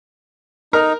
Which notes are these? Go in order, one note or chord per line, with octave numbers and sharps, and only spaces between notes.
D#4 A#4 A#5